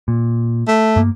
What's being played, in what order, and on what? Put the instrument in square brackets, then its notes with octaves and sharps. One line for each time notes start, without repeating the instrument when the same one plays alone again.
[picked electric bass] A#2
[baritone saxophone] A3
[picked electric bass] G2 A#3